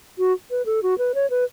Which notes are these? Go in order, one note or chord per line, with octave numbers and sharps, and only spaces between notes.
F#4
B4
A4
F#4
B4
C#5
B4